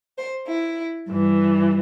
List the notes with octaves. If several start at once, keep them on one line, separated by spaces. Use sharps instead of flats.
C5
E4
G2 E3